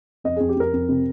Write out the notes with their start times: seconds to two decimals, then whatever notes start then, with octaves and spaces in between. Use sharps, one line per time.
0.24 F2 D#5
0.36 F2 G#4
0.49 G4
0.56 F2 A#4
0.73 F2
0.89 C3